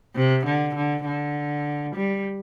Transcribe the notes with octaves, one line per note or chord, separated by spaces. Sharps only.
C3
D3
D3
D3
G3